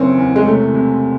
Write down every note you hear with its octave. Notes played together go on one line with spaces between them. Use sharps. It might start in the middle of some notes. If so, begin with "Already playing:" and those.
Already playing: F#1 E3 C4 C#4
E2
G#3
C3 A3
C3